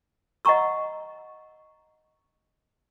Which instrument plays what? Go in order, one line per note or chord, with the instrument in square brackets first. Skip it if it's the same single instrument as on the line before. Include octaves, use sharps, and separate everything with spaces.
[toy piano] D#5 F#5 G#5 A#5 C#6 E6